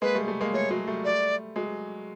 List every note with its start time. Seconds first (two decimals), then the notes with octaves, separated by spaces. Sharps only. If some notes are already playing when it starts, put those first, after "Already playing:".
0.02 G#3 A#3 B4
0.15 G3 A3
0.27 G3 A3
0.41 G#3 A#3
0.54 G3 A3 C#5
0.71 F#3 G#3
0.87 G3 A3
1.05 D5
1.56 F#3 G#3